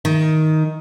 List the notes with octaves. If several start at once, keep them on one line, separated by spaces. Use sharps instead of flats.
D#3